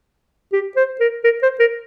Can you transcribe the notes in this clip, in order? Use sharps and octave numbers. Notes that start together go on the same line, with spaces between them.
G4
C5
A#4
A#4
C5
A#4